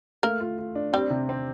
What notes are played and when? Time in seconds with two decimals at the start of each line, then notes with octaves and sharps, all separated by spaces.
0.23 A3 A#3 A#4
0.40 F4
0.58 F4
0.75 D4
0.93 G3 C4 G4
1.10 C3
1.29 C4